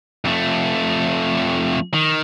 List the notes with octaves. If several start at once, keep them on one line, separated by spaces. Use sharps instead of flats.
F2 A3
D#3